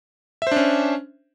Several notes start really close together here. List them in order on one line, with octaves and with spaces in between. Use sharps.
E5 C5 D4 C#4